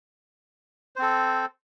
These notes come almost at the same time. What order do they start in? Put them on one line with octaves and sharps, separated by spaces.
C5 C4 A4